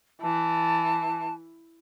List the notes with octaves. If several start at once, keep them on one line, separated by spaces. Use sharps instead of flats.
E3 A5